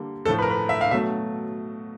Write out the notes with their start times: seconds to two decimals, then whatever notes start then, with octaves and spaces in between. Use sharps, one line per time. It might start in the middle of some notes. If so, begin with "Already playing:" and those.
Already playing: D3 G3 A#3
0.25 A2 F3 A3 A4
0.38 B4
0.42 A#4
0.50 B4
0.69 E5
0.81 F5
0.91 B2 F#3 A3 E5